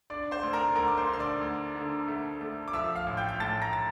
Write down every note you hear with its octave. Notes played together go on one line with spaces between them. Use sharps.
D4 D5 D6
C5 C6
D2
A#4 A#5
D2 A#4 A#5
D6
C5 C6
D3 C6
D5 D6
D2
D3
A3
A3
D6
F3 E5 E6
F5 F6
A1
G5 G6
G6
A2 A5 A6
A#5 A#6
A6